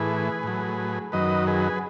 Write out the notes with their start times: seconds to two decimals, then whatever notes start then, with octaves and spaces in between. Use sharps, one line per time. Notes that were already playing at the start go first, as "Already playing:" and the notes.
Already playing: A2 E3 G#4 B4
0.43 A2 F#3
1.12 F#2 D#3 F#3 B4 D#5
1.47 G#4 B4